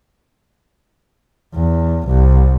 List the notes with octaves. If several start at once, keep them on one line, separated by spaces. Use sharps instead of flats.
E2
C2